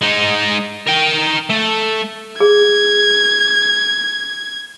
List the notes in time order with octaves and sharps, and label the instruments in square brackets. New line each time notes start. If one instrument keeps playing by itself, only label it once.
[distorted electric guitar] G#3 D#4
A#4 G5
A3
[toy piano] G#4 [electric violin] G#6